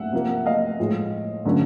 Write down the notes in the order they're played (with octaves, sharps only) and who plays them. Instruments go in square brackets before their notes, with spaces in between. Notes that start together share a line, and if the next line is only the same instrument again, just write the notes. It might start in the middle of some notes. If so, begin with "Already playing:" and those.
Already playing: [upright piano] E5 F#5
C3 F3 A#3
D#5 F5
A2 F3 G#3
D3 F#3 A3 C#4